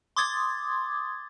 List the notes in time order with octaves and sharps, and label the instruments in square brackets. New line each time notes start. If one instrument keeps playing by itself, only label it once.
[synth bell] C6 D6 D#6 G#6 A6